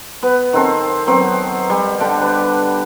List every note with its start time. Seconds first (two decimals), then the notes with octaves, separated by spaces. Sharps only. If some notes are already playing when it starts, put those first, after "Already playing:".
0.23 B3 B4
0.53 D#3 C4 A4
1.07 F#3 B3 C4 G5
1.70 G3
2.00 D3 D4 G4 G5
2.21 B4